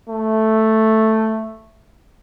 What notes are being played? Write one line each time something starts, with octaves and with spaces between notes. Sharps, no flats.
A3